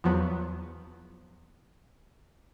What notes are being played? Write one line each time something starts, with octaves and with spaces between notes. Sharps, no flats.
E2 F3 F#3 B3